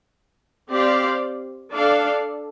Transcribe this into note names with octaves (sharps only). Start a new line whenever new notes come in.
C4 G4 D5 F5
D4 A4 D5 F5